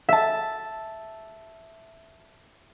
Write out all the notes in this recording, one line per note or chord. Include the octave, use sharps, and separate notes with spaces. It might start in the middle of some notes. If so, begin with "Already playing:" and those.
E5 A5